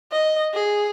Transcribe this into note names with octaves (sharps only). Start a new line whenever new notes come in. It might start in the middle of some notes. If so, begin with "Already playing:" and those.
D#5
G#4